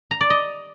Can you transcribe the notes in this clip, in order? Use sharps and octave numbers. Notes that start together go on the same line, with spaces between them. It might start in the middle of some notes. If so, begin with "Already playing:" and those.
A#5
D5
D#5